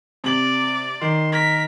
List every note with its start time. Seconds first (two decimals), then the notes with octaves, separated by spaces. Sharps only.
0.24 C3 D5 F#7
1.01 D#3 C6
1.32 A#4 B6